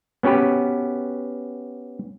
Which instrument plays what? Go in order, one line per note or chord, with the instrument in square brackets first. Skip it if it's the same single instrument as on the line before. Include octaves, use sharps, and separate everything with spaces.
[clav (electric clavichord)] B3 C#4 F#4 G4 B4